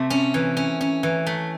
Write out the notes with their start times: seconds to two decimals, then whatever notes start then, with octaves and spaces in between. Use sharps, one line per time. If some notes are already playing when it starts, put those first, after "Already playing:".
Already playing: C3 A3
0.10 C#4
0.34 E3
0.57 C#4
0.81 C#4
1.03 E3
1.27 A3